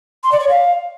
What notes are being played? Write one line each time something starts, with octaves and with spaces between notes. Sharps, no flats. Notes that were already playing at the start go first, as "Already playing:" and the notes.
C6
D5
C#5
F5